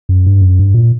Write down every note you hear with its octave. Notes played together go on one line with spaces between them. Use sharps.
F#2
G2
F#2
G2
A#2